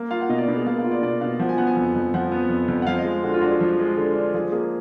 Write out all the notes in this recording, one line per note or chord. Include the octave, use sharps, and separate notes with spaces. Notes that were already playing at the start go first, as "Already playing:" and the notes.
Already playing: A#3
F4 F5
F#5
B2 D#5
D5
B2 B4
G#4
A#3 F5
F5
F4
D5
B2 D5
B2 F5
F3 F#5
G#5
B3 F#5
G#5
F2
F2
F3 F#5
B3
F2
F2
F#5
F3 F5
D#5
G#3
D3 F#4
F4
D4 F#4
G#4
F3
G#3
D3
D4
F3 G#4
A#3 G#4